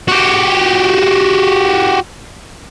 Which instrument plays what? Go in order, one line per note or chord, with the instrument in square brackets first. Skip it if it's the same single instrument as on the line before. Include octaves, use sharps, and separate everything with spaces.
[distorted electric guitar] F#4 G4